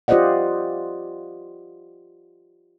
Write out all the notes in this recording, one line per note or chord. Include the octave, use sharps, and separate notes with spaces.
F4 G4 C5 D5 D#5 F#5